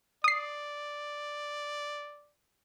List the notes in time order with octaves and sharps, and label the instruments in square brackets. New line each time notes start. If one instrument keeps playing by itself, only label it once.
[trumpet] D5 [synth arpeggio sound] D#6 C7